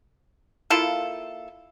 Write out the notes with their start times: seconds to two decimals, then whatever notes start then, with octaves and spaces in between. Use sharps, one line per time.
0.70 A#3 E4 F4 A4